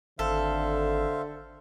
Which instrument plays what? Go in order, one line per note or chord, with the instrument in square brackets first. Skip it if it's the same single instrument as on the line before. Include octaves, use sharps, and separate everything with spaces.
[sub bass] G#1 [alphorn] D3 [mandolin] A4 [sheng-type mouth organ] C5 E5 F5